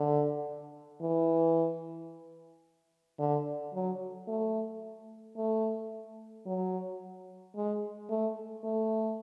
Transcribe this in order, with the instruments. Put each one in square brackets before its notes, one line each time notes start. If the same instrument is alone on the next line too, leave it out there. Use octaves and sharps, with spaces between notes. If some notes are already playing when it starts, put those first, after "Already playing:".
Already playing: [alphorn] D3
E3
D3
F#3
A3
A3
F#3
G#3
A3
A3